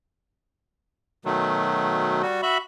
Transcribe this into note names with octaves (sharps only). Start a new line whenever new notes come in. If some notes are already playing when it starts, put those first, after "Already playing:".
B2 D#3 F#3 A3
G3 F#4
F#4 E5 B5